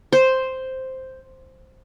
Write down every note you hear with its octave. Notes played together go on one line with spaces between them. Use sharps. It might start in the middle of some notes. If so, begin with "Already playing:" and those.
C5